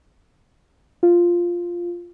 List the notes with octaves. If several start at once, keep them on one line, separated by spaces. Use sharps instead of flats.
F4